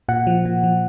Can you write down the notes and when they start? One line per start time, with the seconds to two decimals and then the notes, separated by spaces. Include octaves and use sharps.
0.09 A#2 F#5
0.27 F3
0.45 A#2
0.64 F3